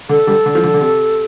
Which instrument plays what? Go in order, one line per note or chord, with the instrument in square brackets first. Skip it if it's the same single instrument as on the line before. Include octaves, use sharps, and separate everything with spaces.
[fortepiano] D3 [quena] A4
[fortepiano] D3 G3
D3
F3
D3
D3
C3